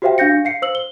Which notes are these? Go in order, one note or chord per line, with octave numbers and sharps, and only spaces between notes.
F#4 G4 C5 E5 F5 G5
D4 F5 G6 A#6 C#7
D4
F5 C7 C#7
C5 E6 F#7
G7